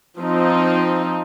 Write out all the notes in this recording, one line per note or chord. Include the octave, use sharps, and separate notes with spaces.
F3 C4 D#4